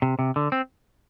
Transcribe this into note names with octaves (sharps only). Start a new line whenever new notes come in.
C3
C3
D3
C4